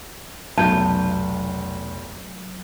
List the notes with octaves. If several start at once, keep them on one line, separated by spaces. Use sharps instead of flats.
F1 B1 F#3 A5 G6